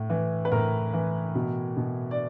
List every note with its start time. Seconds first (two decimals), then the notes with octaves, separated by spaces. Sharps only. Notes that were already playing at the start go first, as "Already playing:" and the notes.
Already playing: A2
0.10 E3
0.45 B4
0.52 A2 A#4
0.93 E3
1.35 B2
1.77 B2
2.11 D5